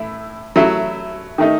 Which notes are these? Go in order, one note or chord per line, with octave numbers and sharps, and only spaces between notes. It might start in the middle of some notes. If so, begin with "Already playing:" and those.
Already playing: A2 E4
F#3 A3 E4
D#3 A3 D#4